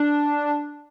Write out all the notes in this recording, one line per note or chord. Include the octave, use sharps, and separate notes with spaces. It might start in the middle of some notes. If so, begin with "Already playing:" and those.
Already playing: D4